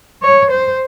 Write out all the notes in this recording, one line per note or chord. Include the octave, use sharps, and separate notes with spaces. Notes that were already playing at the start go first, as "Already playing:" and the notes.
C#5
C5